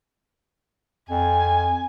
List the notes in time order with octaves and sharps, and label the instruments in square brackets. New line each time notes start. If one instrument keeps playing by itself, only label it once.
[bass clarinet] F2 [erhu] G#5